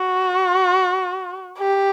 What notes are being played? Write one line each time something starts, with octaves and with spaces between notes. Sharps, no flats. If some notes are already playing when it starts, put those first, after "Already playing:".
Already playing: F#4
G4